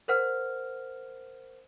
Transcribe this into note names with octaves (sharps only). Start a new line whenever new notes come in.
A#4 C5 F#5 F6